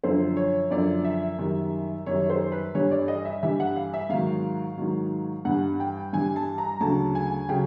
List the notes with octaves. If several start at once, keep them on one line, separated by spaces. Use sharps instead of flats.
F#2 D3 F3 C5
C#5
F#2 D3 F3 D5
E5
F#2 D#3 G3
F#2 D#3 G3 C#5
C5
B4
G2 E3 G3 C#5
D5
D#5
E5
G2 E3 G3 E5
F#5
F5
E5
G#2 D#3 F#3 F5
G#2 D#3 F#3
G2 E3 G3 F#5
G5
G2 E3 G3 G#5
A5
A#5
D2 C#3 F#3 A5
G#5
C#3 F#3 G5